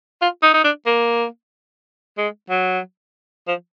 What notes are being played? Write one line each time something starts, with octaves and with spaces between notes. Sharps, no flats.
F4
D#4
D#4
D4
A#3
G#3
F#3
F3